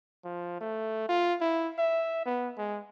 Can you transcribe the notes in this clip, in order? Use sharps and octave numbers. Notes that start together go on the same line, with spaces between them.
F3
A3
F4
E4
E5
B3
G#3